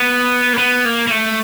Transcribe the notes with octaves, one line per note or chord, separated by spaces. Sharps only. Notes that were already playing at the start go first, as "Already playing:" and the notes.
Already playing: B3
A#3
B3
A#3
A#3
A3